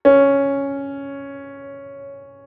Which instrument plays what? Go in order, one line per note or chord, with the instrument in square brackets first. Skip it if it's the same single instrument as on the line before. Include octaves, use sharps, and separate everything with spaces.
[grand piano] C#4